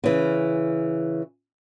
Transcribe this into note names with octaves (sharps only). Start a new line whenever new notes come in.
C#3 E3